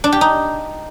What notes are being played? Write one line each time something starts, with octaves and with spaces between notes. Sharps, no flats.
D4
G4
D#4